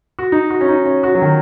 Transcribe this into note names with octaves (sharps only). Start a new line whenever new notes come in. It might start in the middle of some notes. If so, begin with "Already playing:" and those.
F#4
D#4
F#4
C#4
D#4
C#4
F#4
F#3
D#3